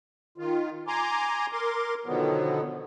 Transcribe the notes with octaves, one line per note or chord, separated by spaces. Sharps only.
D#3 F4
G#5 A#5 C6 D6
A#4 C6 D6
B2 D3 D#3 F3 F#3 B3